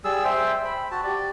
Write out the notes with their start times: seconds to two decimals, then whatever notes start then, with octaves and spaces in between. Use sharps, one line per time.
0.05 G3 G#4 E6
0.24 C5 E5 G5
0.65 B5
0.91 F#4 A5
1.04 G4 D5